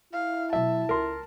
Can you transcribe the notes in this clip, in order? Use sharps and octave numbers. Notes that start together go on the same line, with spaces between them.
E4 F5
B2 F#3 E5 A5
C#2 A#4 C6